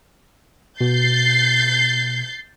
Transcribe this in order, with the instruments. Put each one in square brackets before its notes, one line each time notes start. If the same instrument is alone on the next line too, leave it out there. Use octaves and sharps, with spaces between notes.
[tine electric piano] B2 [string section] G6 A6 C7